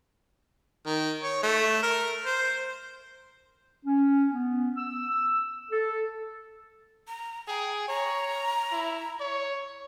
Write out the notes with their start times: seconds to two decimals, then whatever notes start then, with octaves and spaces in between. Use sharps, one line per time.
0.86 D#3
1.23 C#5
1.43 A3
1.83 A#4
2.26 C5
3.86 C#4
4.33 B3
4.77 E6
5.71 A4
7.08 A#5
7.48 G#4 G5
7.88 C#5 A#5
8.72 E4
9.20 C#5